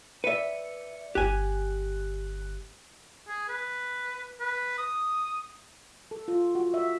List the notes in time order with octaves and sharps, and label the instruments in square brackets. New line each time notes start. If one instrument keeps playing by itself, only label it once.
[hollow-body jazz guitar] B4 E5 [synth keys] D5 C#7
[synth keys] G1 F#6 [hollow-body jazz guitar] G4 G#5
[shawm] G#4
B4
B4
D#6
[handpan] A4
F4
F#4
E5